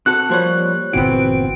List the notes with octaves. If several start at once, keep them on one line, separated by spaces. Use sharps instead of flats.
C3 F#4 A4 F#6
F3 G3 A#3 C5 C#5
G1 A#2 E3 B3 C4 F#4 D7